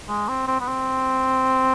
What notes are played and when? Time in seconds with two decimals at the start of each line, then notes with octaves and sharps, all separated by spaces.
0.09 G#3
0.28 C4
0.48 C4
0.60 B3
0.67 C4